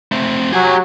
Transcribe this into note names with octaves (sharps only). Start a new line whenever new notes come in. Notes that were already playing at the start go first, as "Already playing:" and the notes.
A3 C4
F#3 G4 G#5